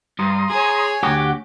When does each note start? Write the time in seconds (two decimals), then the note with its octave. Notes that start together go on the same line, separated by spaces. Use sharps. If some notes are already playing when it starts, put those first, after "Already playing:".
0.19 G2 A#5 C6 D#6
0.50 G#4 C#5 G#5
1.03 D2 F#4 G4 F#5